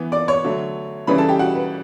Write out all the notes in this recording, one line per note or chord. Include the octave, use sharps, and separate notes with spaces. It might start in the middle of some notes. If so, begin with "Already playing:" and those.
Already playing: E3 B3
D5 D6
C#5 C#6
D3 F#3 A3
C#3 E3 G3 C#4 B4 B5
A4 A5
G4 G5
F#4 F#5
B4